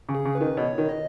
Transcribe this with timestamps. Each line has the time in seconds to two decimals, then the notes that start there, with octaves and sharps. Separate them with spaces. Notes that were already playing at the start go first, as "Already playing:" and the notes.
0.09 C#3
0.15 G#4
0.25 C#3
0.35 B4
0.41 D#3
0.57 B2 C#5
0.78 D#3
0.89 D#5